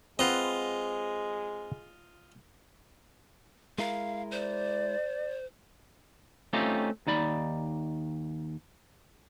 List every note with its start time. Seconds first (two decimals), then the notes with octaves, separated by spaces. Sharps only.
0.19 G#3 C4 F4 B4 D#5 F#5
3.79 G#3 E4 A#4 F5
4.31 C5 D5
6.53 A3 C4 C#4 D#4 F4 G4
7.07 D#2 D#4 D5 B5